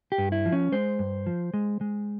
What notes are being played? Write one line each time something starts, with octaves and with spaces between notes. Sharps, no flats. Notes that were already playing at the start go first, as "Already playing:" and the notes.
G4
G2
E4
F3
C#4
G#3 C5
G2
F3
G#3
G#3